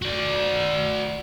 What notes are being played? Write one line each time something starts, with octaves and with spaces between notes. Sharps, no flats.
F#4 D5